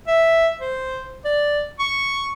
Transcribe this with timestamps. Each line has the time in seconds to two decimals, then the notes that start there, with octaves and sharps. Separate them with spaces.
0.07 E5
0.61 C5
1.25 D5
1.80 C#6